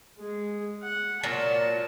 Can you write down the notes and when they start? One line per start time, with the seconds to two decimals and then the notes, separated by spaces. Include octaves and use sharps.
0.18 G#3 G#4
0.83 F#5
1.23 A#2 F#3 A5